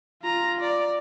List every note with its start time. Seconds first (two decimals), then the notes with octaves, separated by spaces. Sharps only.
0.22 F4 A#5
0.61 D5